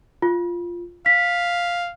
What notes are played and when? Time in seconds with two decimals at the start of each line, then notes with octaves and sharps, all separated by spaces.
0.22 F4
1.06 F5 B6